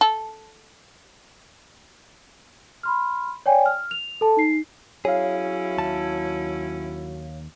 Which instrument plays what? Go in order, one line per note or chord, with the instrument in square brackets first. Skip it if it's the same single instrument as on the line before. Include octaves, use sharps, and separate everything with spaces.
[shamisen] A4
[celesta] B5 C6 F6
C#5 D5 G5 G#5
F6
F7
A4 A5
D#4 C7
[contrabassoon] F#3 [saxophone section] C#4 E4 [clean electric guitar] G#4 [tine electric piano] C#5 F5
[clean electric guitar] D#2 A5